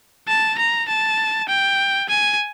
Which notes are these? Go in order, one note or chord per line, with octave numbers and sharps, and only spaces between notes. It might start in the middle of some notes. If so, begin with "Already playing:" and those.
A5
A#5
A5
G5
G#5